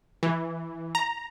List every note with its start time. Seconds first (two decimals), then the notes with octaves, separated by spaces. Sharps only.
0.23 E3
0.95 A#5